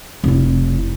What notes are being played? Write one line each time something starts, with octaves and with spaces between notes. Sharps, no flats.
F1 E4